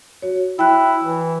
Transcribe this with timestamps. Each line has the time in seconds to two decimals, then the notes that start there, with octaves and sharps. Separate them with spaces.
0.22 F#4 C#5
0.59 E4 G5 F#6
1.04 E3